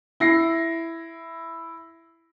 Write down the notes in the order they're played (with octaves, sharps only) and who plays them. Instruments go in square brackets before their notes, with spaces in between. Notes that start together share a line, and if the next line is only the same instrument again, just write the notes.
[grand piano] E4 A#6 C7